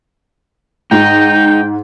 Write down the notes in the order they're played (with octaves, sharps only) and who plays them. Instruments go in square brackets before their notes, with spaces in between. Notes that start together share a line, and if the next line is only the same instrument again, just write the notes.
[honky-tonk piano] G#2 [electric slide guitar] D#4 [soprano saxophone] G5